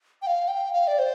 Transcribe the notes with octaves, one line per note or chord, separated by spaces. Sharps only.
G5
F5
G5
F5
D5
C5